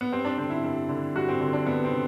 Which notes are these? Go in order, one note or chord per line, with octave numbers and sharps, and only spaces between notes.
B3
G2 C4
D4
D3 C4
E4
G2
D3
G2 F#4
C4
D3
D4
G2 B3
C4
D3